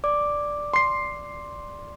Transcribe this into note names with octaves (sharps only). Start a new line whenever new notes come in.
D5 D6
C6 C7